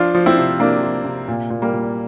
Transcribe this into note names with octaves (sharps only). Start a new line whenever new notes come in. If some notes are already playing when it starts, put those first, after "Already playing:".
Already playing: F3 D4 F4
F3
C4 E4
C3
C3 A#3 D4
F3
C3
A#2
A#2
G3 A#3
A#2